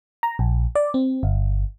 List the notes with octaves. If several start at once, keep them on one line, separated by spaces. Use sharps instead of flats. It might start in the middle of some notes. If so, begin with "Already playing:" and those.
A#5
A#1
D5
C4
G1